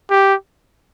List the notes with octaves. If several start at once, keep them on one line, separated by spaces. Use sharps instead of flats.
G4